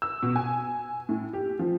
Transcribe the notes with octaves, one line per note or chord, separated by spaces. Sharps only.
E6
B2
G#5
A2
G4
F3